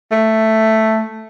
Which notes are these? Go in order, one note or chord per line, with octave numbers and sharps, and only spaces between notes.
A3